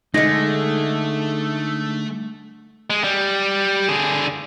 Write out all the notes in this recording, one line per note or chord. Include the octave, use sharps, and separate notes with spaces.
D3 G#3 A3 D#4 D#5 A#6
G#3
G3
D3 G#4